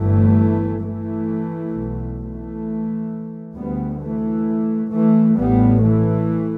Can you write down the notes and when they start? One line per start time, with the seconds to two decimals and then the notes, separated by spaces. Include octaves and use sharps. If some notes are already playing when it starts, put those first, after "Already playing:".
Already playing: G1 G2 E3 A3
0.82 E3 A3
1.73 B1 B2
2.19 E3 A3
3.55 D2 G3 B3
4.01 E3 A3
4.92 E3 A3
5.37 A1 A2 G3 B3
5.83 E3 A3